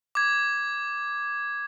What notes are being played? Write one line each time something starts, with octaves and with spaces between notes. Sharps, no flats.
D6 G#6